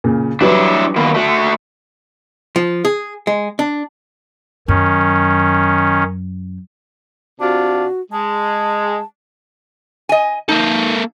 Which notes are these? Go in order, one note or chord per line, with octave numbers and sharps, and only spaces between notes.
A#2 C#3
E3 F#3 G3 D4 E4 C#5
D#3 A#3 B3
A3 F#4
F3
G#4
G#3
D4
F#2 D#3 C#4
C3 D4 F4 F#4
G#3 A5
D#5 G#5
A#3 D#4 A4